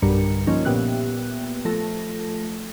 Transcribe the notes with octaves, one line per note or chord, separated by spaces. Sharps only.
B1 G2 D3 G3 A#4 C#7
F3 A#3 C#4 D#4
A#2 B3 G4 E5 F#6
F3 A3 A4 A#6